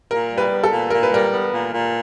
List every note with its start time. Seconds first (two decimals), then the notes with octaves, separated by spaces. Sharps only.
0.11 A#2 A#4
0.30 G3
0.38 B4
0.50 B3
0.64 A4
0.71 A#2
0.90 A#2 A#4
1.03 B4
1.11 G3 A#4
1.31 B3
1.51 A#2
1.72 A#2